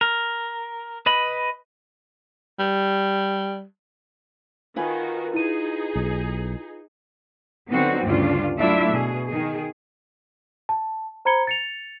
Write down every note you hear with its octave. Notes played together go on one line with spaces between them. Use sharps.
A#4
B4 D#5 B5
G3
D#3 F4 F#4 B4 G#5
D#4 E4 G#4 D#7
B1
D3 F#3 B3 C4 D#4 F#4
D2 G2 C#3 D4 F4
F#3 A3 D4 E4 F4 E5
B2 G#4
D#3 G#4
A5
C5 A#5 B5 G#6 C#7 G7
A6 C#7 F7